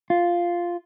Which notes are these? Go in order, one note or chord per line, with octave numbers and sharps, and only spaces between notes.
F4